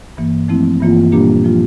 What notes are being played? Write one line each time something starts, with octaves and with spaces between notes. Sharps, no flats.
G2 E3 A#3
F3 A3 C4 E4
G2 E3 A#3 F4
A#2 G3 A#3 D4 G4
F3 A#3 F4